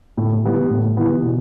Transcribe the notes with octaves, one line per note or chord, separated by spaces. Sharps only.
A2
E3 G3 B3 E4
A2
E3 G3 B3 E4
B2